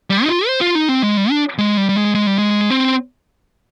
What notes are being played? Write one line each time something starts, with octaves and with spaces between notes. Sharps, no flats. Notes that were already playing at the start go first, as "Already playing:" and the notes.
G3
D#4
F4
C5
F4
D#4
C4
G#3
G3
D4
G#3
G3
G3
G#3
G#3
G3
G#3
C4